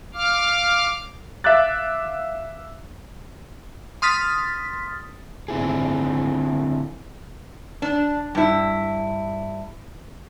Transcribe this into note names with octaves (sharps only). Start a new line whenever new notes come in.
F5 D6 F6
E5 F5 D6 F#6 A6
C6 D#6 F6 A6 B6
D3 C4 E4 G#4
D4
G2 E4